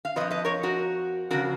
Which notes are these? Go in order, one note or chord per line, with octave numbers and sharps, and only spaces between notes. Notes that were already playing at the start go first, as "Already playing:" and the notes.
F5
F2 C#3 F3 B4 D#5
B4 D#5
A#4 C#5
F#4 A#4
F2 C#3 F3 F#4 A#4